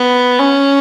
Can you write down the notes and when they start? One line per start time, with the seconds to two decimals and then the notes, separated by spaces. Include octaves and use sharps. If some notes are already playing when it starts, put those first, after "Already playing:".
Already playing: B3
0.39 C#4